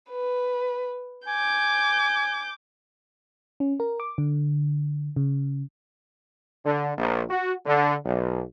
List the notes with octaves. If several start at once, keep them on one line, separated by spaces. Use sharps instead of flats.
B4
G#5 D6 G6
C#4
A#4
D6
D3
C#3
D3
A#1
F#4
D3
B1